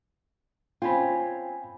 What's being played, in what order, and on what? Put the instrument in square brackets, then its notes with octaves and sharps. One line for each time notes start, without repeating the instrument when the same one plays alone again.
[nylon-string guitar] C4 C#4 F4 [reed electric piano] G5 G#5 B5